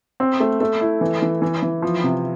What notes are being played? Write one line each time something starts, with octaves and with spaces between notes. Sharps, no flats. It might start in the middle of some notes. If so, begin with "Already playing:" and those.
C4
A3
A3
E4
E3
E3
E3
E3
F3
C3